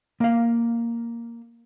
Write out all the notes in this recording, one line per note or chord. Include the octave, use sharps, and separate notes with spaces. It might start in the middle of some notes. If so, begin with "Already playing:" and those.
A#3 F5